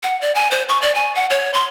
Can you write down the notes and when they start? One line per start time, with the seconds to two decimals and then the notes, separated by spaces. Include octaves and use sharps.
0.03 F#5
0.21 D5
0.35 G#5
0.51 C5
0.69 C#6
0.82 D5
0.95 G#5
1.15 F#5
1.30 C#5
1.54 C6